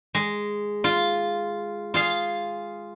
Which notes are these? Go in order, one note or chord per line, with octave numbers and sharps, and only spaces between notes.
G#3
F4
F4 G#4 F5